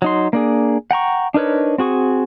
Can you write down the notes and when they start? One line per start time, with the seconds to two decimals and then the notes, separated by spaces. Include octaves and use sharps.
0.02 F#3 D#4 C6
0.33 A#3 D4 G#4
0.91 F#5 G5 A#5 C#6
1.34 D4 D#4 A#4 B4 C#5
1.78 C4 F#4 G#4 C#6